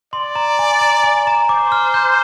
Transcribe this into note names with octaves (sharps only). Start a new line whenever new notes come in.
D5 C6
A#5
G#5
A#5
G#5
A#5
C5 D6
F6
G6